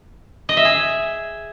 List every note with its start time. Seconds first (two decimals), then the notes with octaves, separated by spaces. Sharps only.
0.49 D#5
0.57 E5
0.65 G#4